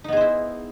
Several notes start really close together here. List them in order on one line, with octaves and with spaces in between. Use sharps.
D#4 B3 G#4 C5 E4